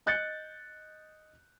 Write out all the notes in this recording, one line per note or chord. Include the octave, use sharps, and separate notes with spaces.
D#5 F#6 G6 A6 C#7